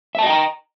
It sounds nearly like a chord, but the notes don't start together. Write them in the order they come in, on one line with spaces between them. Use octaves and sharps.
E5 A5 D#5 G5 A#5